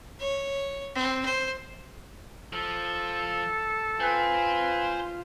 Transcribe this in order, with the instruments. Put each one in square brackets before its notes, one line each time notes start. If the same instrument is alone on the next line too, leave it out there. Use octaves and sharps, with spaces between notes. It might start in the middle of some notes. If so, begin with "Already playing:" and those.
[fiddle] C#5
C4
C5
[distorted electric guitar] F3 [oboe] A4
[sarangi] F4 [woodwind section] B4 G#5 [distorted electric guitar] C5 G5